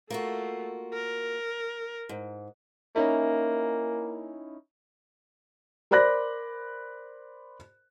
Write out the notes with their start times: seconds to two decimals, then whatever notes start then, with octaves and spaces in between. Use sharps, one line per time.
0.11 A3 A#3 F4 F#4
0.94 A#4
2.09 G#2
2.96 A#3 C#4 D#4 E4
5.91 A#4 C5 D5 B5 F#6 A#6